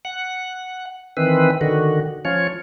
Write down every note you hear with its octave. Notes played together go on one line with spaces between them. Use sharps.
F#5
D#3 E3 C4 B4
D3 D#3 F#4
F3 C#4 F4 C#5